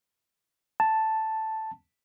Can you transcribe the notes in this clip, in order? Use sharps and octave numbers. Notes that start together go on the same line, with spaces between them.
A5